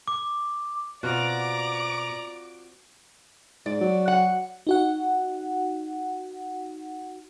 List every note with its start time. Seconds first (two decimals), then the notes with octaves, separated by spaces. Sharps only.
0.08 D6
1.03 B2 C4 F4 F#4 D5 A#5 D6
3.66 G#2 D5
3.81 F#3
4.08 F#5
4.67 D#4 F#4 F#5